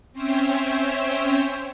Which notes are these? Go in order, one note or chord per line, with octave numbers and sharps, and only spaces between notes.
C4 C#4 C5 C#5 E5 G5